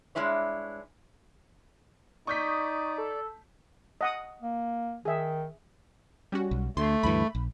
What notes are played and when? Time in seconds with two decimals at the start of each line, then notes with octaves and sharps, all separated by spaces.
0.15 G2 G#3 D4 E4 C#5
2.27 D#4 D5 C#6 D#6 G6 B6
2.98 A4
4.01 D#5 F#5 D#6
4.42 A#3
5.05 D#3 G#4 E5
6.32 G3 C#4 F#4
6.51 B1
6.77 D2 A3 C6
7.03 D2 G2 E3 B5
7.35 A#1